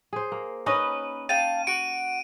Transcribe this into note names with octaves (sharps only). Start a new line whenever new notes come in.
G#4 C5
A#3
C#4 D#4 B4 D#5
F5 G5 A5 D#7
F#4 D7